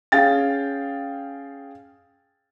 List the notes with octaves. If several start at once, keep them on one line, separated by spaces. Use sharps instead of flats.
C#4 G#4 F5 G5 A6